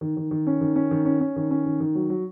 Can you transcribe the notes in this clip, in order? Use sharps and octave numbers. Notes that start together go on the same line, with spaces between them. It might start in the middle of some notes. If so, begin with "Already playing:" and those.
D#3
D#3
D#3
C#4
D#3
C#4
D#3
C#4
C#4
D#3
C#4
D#3
D#3
F#3
F#3